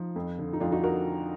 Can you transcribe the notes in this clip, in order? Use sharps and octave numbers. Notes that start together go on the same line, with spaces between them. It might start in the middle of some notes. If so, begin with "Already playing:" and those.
Already playing: F3 D#4
F2
D3
D#4
F2 D4 F4
D#4 F#4
F#4 A#4